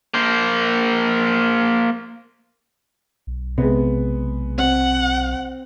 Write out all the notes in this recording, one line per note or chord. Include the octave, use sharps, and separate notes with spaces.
A#3 C5
B1
C3 G#3 B3
C4 F#5